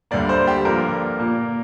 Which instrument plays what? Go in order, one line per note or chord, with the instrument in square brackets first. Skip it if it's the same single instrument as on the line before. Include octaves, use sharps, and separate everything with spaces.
[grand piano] D2 D3 G3 A#3 D5
C5
G4
G2 D3 F3 A#3 A#4
A#2 A#3